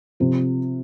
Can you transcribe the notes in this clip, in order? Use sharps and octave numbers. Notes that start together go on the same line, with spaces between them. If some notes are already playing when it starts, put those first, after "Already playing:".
C3 F3 C4